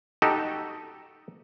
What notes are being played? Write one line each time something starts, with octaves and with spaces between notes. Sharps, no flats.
D#4 F#4 G4 A4